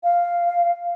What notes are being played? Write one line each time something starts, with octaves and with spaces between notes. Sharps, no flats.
F5